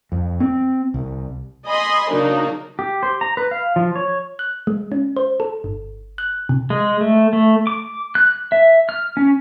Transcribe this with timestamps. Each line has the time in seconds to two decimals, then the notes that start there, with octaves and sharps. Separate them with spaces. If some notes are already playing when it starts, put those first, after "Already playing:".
0.12 F2
0.40 C4
0.94 C2
1.66 D#5 G#5 B5 C6
2.10 C#3 F#3 A#3 D4 D#4
2.79 G4
3.03 C5
3.21 A#5
3.37 B4
3.51 F5
3.76 F3
3.96 C#5
4.39 F#6
4.67 G#3
4.92 C#4
5.17 C5
5.40 A4
5.64 G1
6.18 F#6
6.49 C3
6.70 G#3
7.01 A3
7.33 A3
7.67 D6
8.15 F#6
8.52 E5
8.89 F6
9.17 C#4